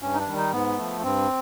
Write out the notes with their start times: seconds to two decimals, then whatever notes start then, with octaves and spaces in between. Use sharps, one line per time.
0.02 G2 C#4
0.13 D#4
0.19 D4
0.27 D#3 G3
0.36 D#4
0.52 G#2 B3
0.77 F3 A3
1.02 G2 C4